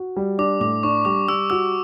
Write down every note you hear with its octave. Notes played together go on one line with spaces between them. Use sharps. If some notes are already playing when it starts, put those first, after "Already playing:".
Already playing: F#4
G3
D4 D6
A2 D6
D4 C#6
G3 D6
G3 E6
F#4 E6